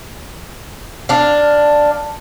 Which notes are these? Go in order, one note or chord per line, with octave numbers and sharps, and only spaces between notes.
D4 F5